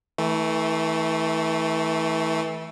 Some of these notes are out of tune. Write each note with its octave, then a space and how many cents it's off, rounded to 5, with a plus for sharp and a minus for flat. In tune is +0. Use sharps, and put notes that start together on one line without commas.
E3 -30 A3 +0